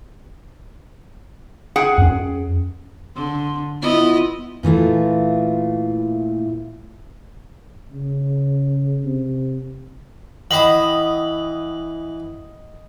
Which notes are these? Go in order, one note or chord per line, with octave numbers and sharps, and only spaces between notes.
G#4 F#5 G5
F2 C#4
D3 C6
B3 E4 F4 D#5
A#2 E3 A3 F4
C#3
C3
E3 D#5 F#5 G5 B5 D#6 F#7